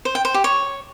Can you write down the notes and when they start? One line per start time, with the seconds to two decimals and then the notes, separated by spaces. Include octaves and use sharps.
0.05 C5
0.15 G5
0.25 C5
0.34 G4
0.44 C#5